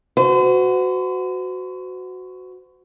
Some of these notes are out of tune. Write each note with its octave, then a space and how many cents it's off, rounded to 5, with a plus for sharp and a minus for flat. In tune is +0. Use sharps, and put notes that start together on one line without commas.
F#4 +0 C5 -45